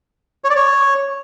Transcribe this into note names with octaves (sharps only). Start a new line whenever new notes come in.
C#5
D5
C#5